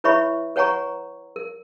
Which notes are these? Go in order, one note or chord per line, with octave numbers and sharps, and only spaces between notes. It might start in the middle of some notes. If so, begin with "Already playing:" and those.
E4 B4 C#5 E5 B5 C#6
B4 C#5 F#5 G#5 A#5 C#6
A#4